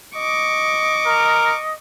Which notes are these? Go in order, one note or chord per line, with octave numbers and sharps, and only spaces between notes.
D#5 C#6 D6
A#4